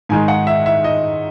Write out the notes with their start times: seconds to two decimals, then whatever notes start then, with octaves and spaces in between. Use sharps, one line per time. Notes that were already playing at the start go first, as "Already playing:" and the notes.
0.09 G#2 D#3 G#3 G#5
0.28 F#5
0.47 E5
0.66 E5
0.84 D#5